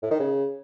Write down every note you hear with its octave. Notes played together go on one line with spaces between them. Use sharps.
A2
D#3
C#3